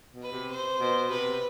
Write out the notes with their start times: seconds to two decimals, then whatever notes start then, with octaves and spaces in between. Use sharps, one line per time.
0.13 B2
0.22 B4
0.32 C3
0.51 C5
0.80 B2
1.09 C3 B4